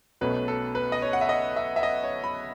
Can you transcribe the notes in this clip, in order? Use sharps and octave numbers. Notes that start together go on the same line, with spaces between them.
B1 B2 A3 C#4 B4
A4
B4
D#5
C#5
F#5
E5
D#5
E5
E5
D#5
C#5
B5